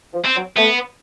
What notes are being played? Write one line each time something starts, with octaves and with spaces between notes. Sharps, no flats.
F3
C4
F#3
A3 B3